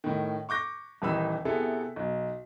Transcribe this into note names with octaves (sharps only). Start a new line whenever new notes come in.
A2 D#3
C#6 D6 G6 A#6
D#1 D#3 E3 D#4 B5 E6
C3 B3 E4 G#4 A4
B1